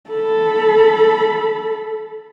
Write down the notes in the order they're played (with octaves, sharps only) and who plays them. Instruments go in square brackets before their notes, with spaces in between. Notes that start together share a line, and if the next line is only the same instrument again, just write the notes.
[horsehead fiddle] A4 B5